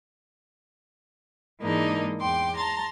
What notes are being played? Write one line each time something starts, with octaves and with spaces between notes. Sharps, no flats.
G#2 E3 G#3 A#3 D4 D#4
E2 G5 C6 D6
A5 A#5 C6 A6